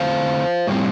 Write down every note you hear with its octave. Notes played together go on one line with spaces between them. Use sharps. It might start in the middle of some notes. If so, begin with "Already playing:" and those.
Already playing: D3 A3 C4 C5 F5
A2 G3 C4